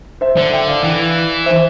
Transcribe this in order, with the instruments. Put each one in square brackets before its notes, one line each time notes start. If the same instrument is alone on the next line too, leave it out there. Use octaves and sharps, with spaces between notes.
[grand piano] C5 E5
[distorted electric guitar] D3
[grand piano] E5 G5
D5 F5
[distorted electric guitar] E3
[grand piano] C5 E5